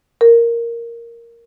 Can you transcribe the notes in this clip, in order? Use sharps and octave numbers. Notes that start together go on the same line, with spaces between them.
A#4